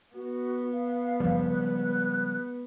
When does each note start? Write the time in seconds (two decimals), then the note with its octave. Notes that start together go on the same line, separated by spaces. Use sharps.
0.15 B3 F#4
0.73 F5
1.20 F#1 C#2 C#3 F3 G3
1.54 G#3 F#6